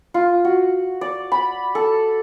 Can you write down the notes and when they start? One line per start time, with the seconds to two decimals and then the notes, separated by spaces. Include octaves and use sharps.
0.14 F4
0.45 F#4
1.01 D5
1.32 B5
1.75 A4